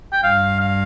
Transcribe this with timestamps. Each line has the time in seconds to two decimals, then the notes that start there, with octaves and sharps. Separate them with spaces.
0.13 G5
0.24 G2 F5
0.60 F5